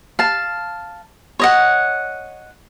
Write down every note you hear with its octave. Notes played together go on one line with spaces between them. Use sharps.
F5 A5
C#5 D#5 F#5